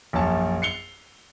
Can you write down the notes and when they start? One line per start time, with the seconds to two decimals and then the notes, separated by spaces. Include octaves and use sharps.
0.13 A#1 F#2 C#5 A5
0.62 C7 C#7 F7 G7